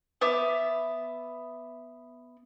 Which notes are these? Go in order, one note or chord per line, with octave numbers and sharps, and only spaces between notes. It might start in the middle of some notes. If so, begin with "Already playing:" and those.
B3 E5 D6